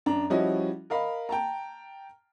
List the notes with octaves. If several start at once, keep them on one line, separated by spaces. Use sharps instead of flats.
F#2 D4 A#5
F3 G3 C#4 E4 F#4 D#5
A#4 D#5 F5 B5
G5 A5 A#5